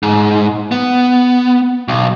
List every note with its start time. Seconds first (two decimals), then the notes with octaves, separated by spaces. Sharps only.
0.03 G#2
0.71 B3
1.88 B1